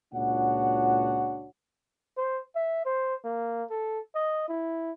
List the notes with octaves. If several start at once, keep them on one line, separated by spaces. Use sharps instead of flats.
C#2 A#2 D4 F#4 C#5 F#5
C5
E5
C5
A#3
A4
D#5
E4